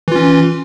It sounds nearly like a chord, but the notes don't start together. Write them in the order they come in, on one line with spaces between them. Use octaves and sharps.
E3 F4 C#4